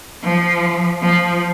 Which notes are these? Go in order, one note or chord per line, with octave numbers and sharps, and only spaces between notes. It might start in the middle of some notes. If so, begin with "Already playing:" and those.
F3
F3